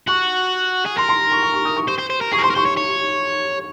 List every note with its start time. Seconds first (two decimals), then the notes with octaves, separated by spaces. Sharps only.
0.08 F#4 C#6
0.86 G#4
0.98 A#4 C6
1.09 C6
1.32 C#6
1.43 C#6
1.54 C#6
1.65 D#6
1.76 C#6
1.88 C5
1.98 C5
2.10 C5
2.21 A#4
2.32 G#4 C#6
2.39 A#4
2.43 C5 C6
2.50 A#4
2.55 C5 C#6
2.66 C#5
2.77 C#5